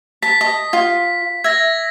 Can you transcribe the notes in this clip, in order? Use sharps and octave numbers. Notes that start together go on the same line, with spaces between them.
A5 B6
D#5
F4
E5 G#6 A#6